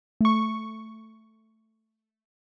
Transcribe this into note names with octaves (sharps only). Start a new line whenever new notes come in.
A3 C#6